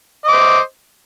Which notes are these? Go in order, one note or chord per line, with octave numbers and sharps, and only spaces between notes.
C5 D#5 D6